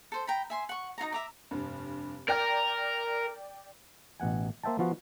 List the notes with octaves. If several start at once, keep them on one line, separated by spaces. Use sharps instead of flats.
A4 C5
G5 A#5 B5
E5 G#5 C6
F#5 C#6
D#4 F4 F#4 A#5
E5 A#5 D6
F1 G2
A#4 D5 G5
A1 B2 F#5 G#5
A#3 C5 E5 G5 A5
F3 B3 F4 F#4 F5